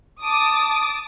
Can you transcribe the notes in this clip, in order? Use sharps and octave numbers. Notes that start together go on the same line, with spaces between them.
A5 D6 D#6